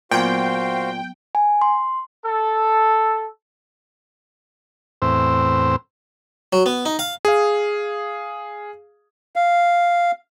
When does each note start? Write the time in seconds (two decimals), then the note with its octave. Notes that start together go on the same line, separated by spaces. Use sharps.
0.11 A#2 F#3 B3 F#4 C5 F5 G5
1.35 G#5
1.62 C6
2.25 A4
5.02 E2 A2 C4 C5 E6
6.53 F#3
6.66 B3
6.86 D#4
6.99 F5
7.25 G#4 F5
9.36 F5